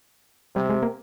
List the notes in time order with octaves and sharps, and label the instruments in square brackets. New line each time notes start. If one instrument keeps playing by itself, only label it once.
[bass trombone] C3 [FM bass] G3
[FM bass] G#3
A#3